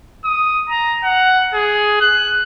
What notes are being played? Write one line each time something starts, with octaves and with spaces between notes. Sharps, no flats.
D#6
A#5
F#5
G#4
F#6